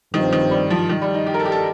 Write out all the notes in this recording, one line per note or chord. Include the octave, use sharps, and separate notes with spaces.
G2 D#3 F3 C4
D#3
G3
F3
D#3
G3
D#4
G4
A#4
A4
G4
A4